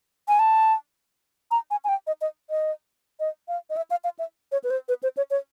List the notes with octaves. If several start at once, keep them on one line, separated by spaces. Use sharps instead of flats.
G#5
A5
A#5
G#5
G#5
G5
D#5
D#5
D#5
D#5
F5
D#5
E5
F5
F5
E5
C#5
B4
C5
B4
C5
C#5
C#5